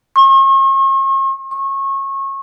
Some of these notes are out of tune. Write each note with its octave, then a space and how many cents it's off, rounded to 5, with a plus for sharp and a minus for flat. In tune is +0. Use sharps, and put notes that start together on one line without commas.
C#6 -45
C#6 -25